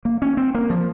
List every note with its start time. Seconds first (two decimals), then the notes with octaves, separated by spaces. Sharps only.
0.05 A#3
0.22 C#4
0.37 C4
0.55 A#3
0.70 F3